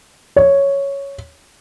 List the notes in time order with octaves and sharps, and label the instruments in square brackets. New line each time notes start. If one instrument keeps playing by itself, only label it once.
[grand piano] C#5